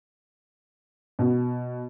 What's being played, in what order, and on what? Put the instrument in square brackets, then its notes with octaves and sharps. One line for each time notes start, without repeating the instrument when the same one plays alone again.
[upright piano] B2